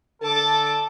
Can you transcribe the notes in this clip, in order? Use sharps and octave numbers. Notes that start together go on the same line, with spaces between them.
D3 A4 A5 D6